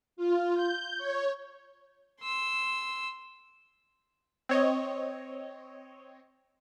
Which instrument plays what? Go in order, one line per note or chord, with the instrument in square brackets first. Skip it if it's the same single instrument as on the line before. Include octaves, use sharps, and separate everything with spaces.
[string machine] F4
G6
C#5
[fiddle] C6 E6
[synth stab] C4 C#5 D#5